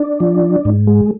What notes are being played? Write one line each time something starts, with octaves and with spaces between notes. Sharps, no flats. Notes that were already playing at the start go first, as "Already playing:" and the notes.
Already playing: D4
F3
G#2
G#3